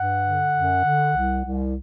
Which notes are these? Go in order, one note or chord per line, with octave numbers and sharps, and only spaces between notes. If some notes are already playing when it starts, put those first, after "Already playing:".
Already playing: G2 F#5
D3
F#2
D3
C2
C2